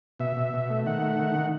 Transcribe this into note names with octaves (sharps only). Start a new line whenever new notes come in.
B2 E5
B2
B2
A3
D#3 F#5
A3
D#3
D#3